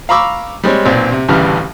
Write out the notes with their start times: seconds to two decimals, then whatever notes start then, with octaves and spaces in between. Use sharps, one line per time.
0.09 F5 A#5 B5 C#6 D6 E6
0.64 G3 G#3 C4 C#5
0.85 B1 A#2 C4 D5
1.12 C3
1.29 A1 D2 C#3 E3 G3 F6